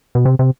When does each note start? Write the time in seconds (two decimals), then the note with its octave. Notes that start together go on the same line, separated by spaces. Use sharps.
0.15 B2
0.25 C3
0.39 C3